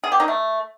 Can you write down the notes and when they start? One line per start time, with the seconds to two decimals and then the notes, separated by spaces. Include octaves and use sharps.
0.04 G#4
0.12 G4
0.20 D#4
0.28 A3